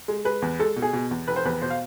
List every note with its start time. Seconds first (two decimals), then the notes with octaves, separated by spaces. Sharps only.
0.08 G#3
0.25 G#3 B4
0.42 E2
0.59 G#3 A4
0.76 B2
0.82 G#4
0.93 B2
1.11 E2
1.28 F1 B4
1.36 C5
1.45 E2 B4
1.62 B2 C5
1.70 F5